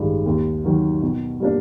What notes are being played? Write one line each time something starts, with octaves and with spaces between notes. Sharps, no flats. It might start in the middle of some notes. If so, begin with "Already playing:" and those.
Already playing: A1 G2 D#3 G#3
D#2
D#3 F#3
B2
G3 A#3 D4